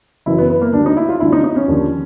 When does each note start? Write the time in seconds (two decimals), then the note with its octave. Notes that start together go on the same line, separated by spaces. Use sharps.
0.26 F#1 F#2 C#3 E3 E4
0.38 B3
0.50 B3
0.61 A#3
0.73 D2 D3 G3 D4
0.86 D#4
0.97 E4
1.09 F4
1.20 D2 D3 G3 E4
1.32 D#4
1.44 D#4
1.56 C#4
1.68 D#2 D3 F3